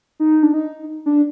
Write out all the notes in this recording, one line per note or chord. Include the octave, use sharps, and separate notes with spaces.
D#4
D4
D#4
D4